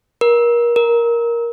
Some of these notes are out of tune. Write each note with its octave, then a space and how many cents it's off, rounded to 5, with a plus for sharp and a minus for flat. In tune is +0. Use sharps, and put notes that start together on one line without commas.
A#4 +30
A#4 +10